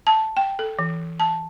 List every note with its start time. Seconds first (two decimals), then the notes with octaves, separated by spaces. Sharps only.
0.07 A5
0.37 G5
0.59 A4
0.79 E3
1.20 A5